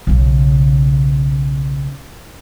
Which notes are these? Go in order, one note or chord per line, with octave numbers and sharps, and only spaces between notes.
B1 C#3